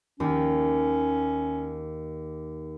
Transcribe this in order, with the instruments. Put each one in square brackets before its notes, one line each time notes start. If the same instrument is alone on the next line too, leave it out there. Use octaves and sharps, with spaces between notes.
[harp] D#2 [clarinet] C#4